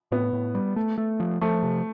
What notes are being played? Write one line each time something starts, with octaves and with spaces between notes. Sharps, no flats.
A2 B3
A2
G3
A3
A3
F3
F3 A3
C3